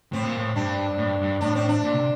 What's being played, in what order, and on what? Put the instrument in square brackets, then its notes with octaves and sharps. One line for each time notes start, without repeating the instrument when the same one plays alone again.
[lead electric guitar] A2 [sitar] C4
[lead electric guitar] A#2
A2
[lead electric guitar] G2 [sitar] D4
[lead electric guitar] A2
G2
G2
[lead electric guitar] A2 [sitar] D4
[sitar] C4
D4
[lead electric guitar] A#2
C3